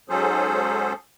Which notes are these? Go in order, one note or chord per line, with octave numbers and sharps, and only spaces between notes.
G#2 F#3 C#4 G#4 A4 C5